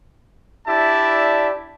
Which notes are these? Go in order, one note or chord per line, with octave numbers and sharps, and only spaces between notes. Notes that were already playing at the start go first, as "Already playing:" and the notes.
D4 E4 G4 D5 E5 A5